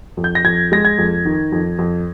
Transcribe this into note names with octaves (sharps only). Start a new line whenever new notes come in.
F2
G6
A#6
F2 G#6
G#3 A#6
G#6
F2
D#3
F2
F2